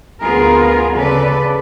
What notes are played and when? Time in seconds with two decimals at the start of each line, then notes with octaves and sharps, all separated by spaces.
0.22 D2 B3 F4 G#4 A#4
0.95 C#3 A4 B4 D5